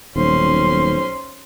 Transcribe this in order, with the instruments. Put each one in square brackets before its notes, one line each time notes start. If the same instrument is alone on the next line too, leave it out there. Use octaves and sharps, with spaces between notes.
[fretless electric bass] D#1 [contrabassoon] B1 [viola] C#4 C6 [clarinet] C5